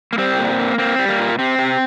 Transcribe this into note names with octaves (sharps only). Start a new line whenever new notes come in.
A#3
G3 C4
A#2
A#3
A#3 C4
G3
A#3
A#2
C3 C4
C3